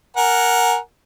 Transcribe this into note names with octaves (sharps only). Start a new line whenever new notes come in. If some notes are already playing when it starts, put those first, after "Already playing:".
A#4 F#5 G#5